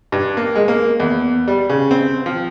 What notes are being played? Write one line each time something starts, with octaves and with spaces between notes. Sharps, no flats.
G2
A#3
G#3
A#3
E2
G3
C#3
C4
F3